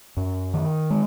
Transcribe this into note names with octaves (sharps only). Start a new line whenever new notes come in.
F#2
D#3
G#3